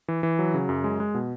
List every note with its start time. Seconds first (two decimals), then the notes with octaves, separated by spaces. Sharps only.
0.08 E3
0.23 E3
0.39 F#3
0.54 C#3
0.69 F#2
0.84 G#3
1.00 G#3
1.14 B2